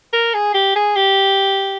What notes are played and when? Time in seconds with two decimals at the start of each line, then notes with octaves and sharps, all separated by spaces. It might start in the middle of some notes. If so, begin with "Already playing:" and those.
0.13 A#4
0.34 G#4
0.54 G4
0.76 G#4
0.96 G4